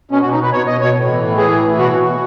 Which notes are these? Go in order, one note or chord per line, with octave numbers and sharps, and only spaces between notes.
B2 C#4
F#4
B2
D#4
B2 B4
B2 C#5
B2 D#5
B2 C#5
A2
E3
A2
E3 G#4
A2
E3
B2 F#4
B2
B2